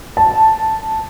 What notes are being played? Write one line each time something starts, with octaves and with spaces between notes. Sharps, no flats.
A5